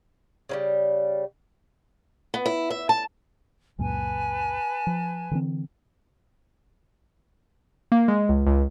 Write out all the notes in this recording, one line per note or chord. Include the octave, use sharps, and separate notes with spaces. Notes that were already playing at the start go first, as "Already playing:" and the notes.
C#3 F#3 G3
B3
E4
E5
A5
C#2 F#2 A#2 B4 G#5 A5
F3
D3 E3 C4
A#3
G#3
C#2
C#2